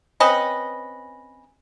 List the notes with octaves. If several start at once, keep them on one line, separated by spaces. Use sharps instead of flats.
C4 C#4 B4 D#5